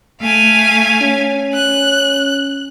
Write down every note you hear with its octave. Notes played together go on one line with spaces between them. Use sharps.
A3 F5 G#5
C#4
F#6